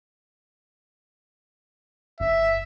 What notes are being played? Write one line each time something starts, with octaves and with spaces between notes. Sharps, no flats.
G1 E5